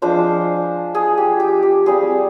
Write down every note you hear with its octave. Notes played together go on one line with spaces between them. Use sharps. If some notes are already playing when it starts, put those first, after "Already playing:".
F3 G#3 D4 F4 C5
G#4
G4
G4
G4
G3 C4 F4 G#4